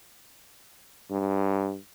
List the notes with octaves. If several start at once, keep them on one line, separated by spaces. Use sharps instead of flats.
G2